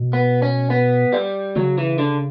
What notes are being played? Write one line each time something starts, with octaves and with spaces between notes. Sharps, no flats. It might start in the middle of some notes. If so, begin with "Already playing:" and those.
Already playing: B2
B3
C#4
B3
G3
C#3 F#3
E3
D3